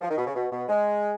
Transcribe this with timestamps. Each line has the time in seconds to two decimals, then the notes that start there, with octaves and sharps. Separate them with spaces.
0.01 F3
0.10 D#3
0.18 B2
0.26 C#3
0.35 B2
0.51 B2
0.69 G#3